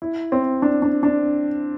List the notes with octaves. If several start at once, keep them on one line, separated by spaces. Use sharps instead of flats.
E4
C4
D4
D4
D4